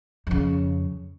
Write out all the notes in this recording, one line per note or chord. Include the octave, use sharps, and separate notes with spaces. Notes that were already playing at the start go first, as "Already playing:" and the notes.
F2 C#3